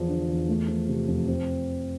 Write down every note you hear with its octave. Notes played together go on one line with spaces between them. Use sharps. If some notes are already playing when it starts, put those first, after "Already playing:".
Already playing: E2 F3
D3
E2
A3
F3
C3
F2
C4